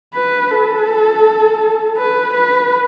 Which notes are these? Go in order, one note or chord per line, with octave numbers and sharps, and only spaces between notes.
B4
A4
B4
B4